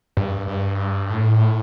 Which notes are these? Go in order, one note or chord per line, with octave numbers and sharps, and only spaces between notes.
G2
G2
A2